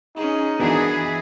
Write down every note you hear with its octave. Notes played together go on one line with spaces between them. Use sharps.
C#4 D#4 G#4
E3 B3 D4 E4 F#4 G#4 A#4